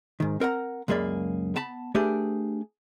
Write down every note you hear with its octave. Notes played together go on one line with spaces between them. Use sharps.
G#2 D#3
C4 A#4 F#5 A#5
C#2 F#2 A#3 G#4 D5 B5
B3 A5 B5
A3 D4 G4 G#4 B4